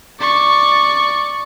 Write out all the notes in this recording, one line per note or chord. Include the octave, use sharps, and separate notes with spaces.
D5 C#6